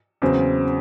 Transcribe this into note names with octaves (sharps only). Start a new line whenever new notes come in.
E2 C#3 F#3 C4